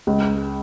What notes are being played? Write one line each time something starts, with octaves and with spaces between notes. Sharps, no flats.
C#2